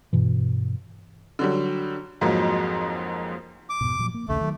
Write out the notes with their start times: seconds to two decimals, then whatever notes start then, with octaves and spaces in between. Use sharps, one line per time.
0.13 G2 B2 E3
1.39 D3 F#3 G3
2.21 F2 G#2 F3 F#3 G#3 A#3
3.70 D6
3.81 F2 G#2 B2
3.99 A#2 F3 F#3
4.14 A#3
4.28 A#1 D#2 C#3 A3
4.41 D#3 E3 F#3